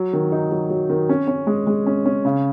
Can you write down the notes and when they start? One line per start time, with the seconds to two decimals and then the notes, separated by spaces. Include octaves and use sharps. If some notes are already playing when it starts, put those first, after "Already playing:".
Already playing: F#3
0.13 D#3
0.32 D#4
0.51 F#3
0.70 F#3
0.90 D#3
1.09 C#4
1.28 C#4
1.47 G#3
1.67 G#3
1.87 C#4
2.06 C#4
2.25 C#3